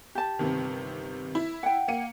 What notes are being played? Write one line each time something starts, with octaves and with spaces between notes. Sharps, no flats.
G4 A5
G1 C3 D#3
E4 B5
F#5 G5
A#3 C#7 D#7